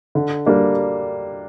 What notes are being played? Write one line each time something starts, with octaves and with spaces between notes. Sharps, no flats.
D3
G3 A#3 D4